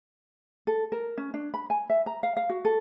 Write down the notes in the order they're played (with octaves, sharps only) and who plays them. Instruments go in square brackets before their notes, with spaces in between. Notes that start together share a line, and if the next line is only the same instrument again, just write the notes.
[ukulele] A4
A#4
C#4
D4
B5
G#5
E5
A#5
F5
F5
F#4
A4